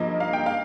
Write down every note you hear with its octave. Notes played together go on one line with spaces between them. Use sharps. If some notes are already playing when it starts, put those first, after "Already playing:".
Already playing: G2 F3 A#3 D#5
F5
G5
F5